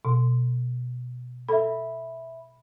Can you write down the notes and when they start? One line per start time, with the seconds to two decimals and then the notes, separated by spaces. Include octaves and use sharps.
0.05 B2
1.48 A4 E5 B5